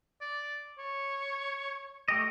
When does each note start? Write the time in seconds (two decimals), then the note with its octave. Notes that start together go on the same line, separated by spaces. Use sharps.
0.21 D5
0.79 C#5
2.08 A3 G4 D#5